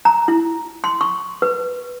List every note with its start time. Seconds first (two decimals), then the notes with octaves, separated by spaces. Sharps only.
0.05 A#5
0.28 E4
0.84 C6
1.01 C#6
1.42 B4